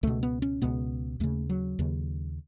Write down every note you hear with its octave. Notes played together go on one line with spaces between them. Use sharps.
C#2 B2 A3
B3
C#4
C#2 B2 B3
D#2 C#3 A3
F#3
D#2 C#3